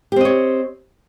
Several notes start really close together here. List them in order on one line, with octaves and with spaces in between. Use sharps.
G4 C4 D#5 C#5